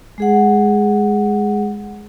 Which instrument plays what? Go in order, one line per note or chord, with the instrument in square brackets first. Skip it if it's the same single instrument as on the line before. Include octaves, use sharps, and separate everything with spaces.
[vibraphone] G#3 G#4 F#5